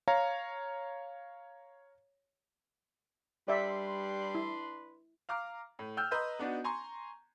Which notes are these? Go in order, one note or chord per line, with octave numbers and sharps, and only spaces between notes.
C#5 F5 A#5
G3 D4 B4 D5 E5 C6
E4
F5 A#5 D6 F6
A2
G5 E6 F6 G6
B4 D#5 A#5 C6 E6 G6
B3 D4 D#4 F#4
G#5 A#5 C6 C#6